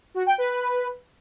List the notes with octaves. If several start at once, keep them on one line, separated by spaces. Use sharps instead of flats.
F#4
G5
B4